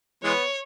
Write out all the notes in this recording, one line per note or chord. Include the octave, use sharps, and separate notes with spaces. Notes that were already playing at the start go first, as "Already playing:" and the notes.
E3 G#3 B3 C#5